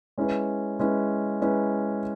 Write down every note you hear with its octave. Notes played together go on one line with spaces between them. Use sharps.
G#3 C#4 E4 B4
G#3 C#4 E4 B4
G#3 C#4 E4 B4